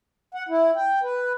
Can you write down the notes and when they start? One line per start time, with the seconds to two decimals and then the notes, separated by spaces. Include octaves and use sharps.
0.34 F#5
0.49 E4
0.76 G5
1.03 B4